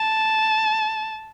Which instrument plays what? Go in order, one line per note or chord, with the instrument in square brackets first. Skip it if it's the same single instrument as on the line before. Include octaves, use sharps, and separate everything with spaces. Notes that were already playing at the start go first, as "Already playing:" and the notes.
Already playing: [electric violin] A5